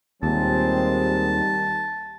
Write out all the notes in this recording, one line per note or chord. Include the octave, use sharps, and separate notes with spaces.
D#2 A#2 D#3 G3 G#3 C4 A5